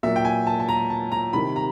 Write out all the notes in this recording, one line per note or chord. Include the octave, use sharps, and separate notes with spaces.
A#2 F#3 E5
G5
G#5
A5
A5
A#5
A5
A#5
C3 D#3 G3 B5
A#5